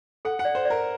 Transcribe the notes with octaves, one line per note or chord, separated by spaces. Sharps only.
A4 F#5
F#5
D5
C5
D5
A#4